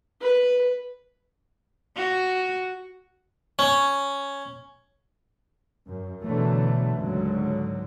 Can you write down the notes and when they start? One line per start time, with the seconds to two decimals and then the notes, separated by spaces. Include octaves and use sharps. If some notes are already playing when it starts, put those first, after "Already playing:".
0.21 B4
1.96 F#4
3.59 C#4
5.86 F#2
6.23 B2 D3 E3 F#3 A3
6.97 C#2 G#2 D3 F#3